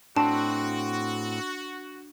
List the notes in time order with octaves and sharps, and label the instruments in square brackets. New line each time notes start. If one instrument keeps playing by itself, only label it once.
[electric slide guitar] A2 C4 [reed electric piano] D4 [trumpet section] F#4 [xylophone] A5